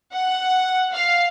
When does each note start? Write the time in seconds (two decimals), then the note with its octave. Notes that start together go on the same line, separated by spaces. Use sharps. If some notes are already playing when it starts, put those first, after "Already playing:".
0.12 F#5
0.92 F5